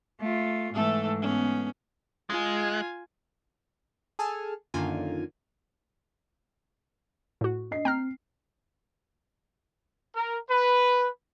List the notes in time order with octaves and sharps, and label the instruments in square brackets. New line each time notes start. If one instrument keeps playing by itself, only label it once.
[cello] A3 F4
[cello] G#2 G#3 [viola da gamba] E3 A3 A4
[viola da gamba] B3 C#4
[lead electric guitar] G#3 [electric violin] F4 G#5
[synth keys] G#4 A4 G#5 A5 F6
F#2 D3 D#3 A#3 F4 G#5
[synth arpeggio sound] A2 F#4
[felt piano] D4 D#5 C7
[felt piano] C4 [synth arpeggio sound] G5 A#5 F6
[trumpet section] A#4
B4